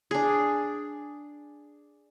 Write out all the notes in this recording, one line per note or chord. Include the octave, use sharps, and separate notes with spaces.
D4 G#4